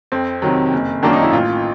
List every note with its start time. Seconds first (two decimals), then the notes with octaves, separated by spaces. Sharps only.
0.12 F2 C4
0.42 C3 D#3 F#3
0.73 F#1
1.03 F#2 D#3 F#3 A#3 D4
1.13 D#4
1.23 E4
1.33 A1 F4